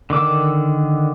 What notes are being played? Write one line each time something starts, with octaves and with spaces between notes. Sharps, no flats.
D3 D#3 D6 E6